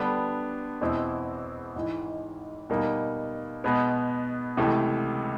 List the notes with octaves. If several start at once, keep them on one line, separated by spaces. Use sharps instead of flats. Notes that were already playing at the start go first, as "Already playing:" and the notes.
Already playing: D3 G3 B3 D4
E2 B2 G#3 C4 E4
G#1 G#2 E3
B2 G3 A#3 D#4
B2 G#3 B3
C#2 C3 E3 A3